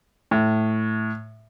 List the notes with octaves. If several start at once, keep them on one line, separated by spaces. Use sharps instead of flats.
A2